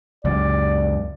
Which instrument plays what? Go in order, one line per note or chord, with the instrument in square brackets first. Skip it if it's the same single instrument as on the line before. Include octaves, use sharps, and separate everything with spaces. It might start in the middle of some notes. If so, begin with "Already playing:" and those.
[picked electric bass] C#2 F#2 [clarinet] D5